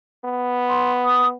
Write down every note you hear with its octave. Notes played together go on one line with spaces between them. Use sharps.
B3
C6
D#6